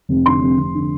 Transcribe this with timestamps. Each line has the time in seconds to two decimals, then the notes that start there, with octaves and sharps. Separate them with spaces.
0.09 F1
0.25 D3 C6
0.42 F1
0.58 F1
0.75 D3